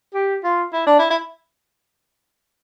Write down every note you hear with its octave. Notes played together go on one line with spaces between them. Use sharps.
G4
F4
E4
D4
E4
E4